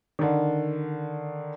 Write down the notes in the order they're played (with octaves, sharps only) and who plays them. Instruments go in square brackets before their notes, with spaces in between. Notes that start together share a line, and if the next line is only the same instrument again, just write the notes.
[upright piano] D3 D#3